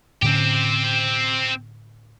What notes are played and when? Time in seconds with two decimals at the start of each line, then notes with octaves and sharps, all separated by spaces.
0.22 A2 D3 C4 C#4 G4